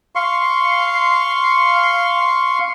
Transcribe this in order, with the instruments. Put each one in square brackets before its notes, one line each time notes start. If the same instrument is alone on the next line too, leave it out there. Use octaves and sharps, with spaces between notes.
[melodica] F5 C6 C#6